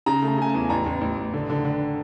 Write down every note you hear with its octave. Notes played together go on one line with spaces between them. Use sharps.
C#3 A#5
A3 A#5
C#3 G#5
A5
E2
A1 A#5
A1
A1
A1
D3
D3
D3